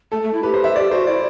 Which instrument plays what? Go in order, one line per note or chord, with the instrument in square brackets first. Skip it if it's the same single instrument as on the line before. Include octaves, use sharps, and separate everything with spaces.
[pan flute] A3 [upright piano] A4
[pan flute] A3
E4
[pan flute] G4 [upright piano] B4
[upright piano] C5
E5
[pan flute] G4 [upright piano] D5
[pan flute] F#4 [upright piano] C5
[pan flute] E4 [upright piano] D5